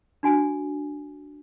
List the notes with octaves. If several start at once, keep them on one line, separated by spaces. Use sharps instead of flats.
D4 F#4 G#5